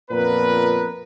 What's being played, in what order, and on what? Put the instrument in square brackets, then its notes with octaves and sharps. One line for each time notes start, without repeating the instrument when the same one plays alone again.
[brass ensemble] F2 A#2 B3 A#4 B4